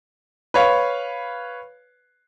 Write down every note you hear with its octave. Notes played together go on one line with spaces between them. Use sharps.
B4 C#5 F5